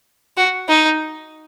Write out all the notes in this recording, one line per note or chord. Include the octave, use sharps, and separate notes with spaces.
F#4
D#4